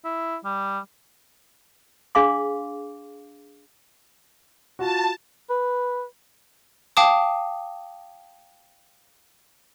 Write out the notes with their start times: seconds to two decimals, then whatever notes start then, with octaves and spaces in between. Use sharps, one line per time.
0.04 E4
0.44 G3
2.15 D4 G#4 F5 C6 D6
4.79 F4 F#4 A5
5.50 B4
6.97 F5 G5 A5 D6 D#6